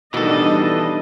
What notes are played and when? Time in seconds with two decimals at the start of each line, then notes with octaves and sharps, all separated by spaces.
0.14 B2 D#3 E3 G3 D4 A4 D#5